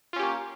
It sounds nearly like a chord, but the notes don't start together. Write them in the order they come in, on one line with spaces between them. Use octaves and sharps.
F4 C#4 G4 A#3